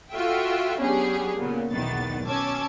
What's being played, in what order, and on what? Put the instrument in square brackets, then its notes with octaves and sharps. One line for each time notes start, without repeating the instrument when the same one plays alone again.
[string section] F4 F#4 A4 E5 G5
F#3 B3 C#4 D4 G4 G#4
A#2 C#3 B3
B1 E2 D#3 B3 A6
B2 C#4 A5 D6 E6 G#6